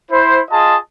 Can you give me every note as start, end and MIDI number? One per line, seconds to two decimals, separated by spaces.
0.11 0.39 64
0.11 0.39 72
0.51 0.76 65
0.51 0.76 68
0.51 0.76 75
0.51 0.76 81